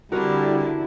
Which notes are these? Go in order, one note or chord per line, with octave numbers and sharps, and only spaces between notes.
D3 G3 C4 D4 E4 F#4 G4 A#4